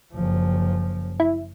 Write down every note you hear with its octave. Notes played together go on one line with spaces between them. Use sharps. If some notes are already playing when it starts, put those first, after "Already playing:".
F#1 F3
E4